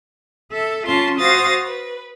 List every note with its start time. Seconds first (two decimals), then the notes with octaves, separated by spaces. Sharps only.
0.50 A4 E5
0.86 C#4 F4 A5 C6
1.18 F#4 C5 F5 D#6 A6 A#6
1.64 B4